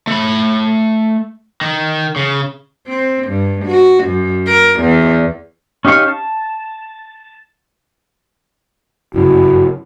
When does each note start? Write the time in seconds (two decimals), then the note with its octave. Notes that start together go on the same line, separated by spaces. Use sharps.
0.07 A3 B5
1.61 D#3
2.16 C#3
2.88 C4
3.29 G2
3.65 F#4
4.04 F#2
4.47 A#4
4.81 E2
5.85 C#4 D#4 G4 F5 C#6
6.08 A5
9.14 G1 F#2 C#3 E4 F#4